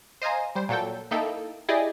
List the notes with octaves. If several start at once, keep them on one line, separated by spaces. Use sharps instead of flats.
C5 D#5 F5 G#5 A#5
G3 C5
A#2 F#3 A4 G5
A#3 D#4 E4 A4 G5
E4 G4 G#4 D5 D#5